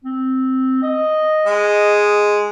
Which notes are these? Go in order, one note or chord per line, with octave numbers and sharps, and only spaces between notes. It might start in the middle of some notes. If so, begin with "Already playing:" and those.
C4
D#5
G#3